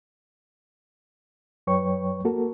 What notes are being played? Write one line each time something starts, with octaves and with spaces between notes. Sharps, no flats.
F#2 F#3 B4 C#5 G5 C#6
A#3 F#4 A4 A#4